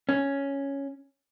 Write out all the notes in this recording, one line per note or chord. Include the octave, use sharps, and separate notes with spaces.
C#4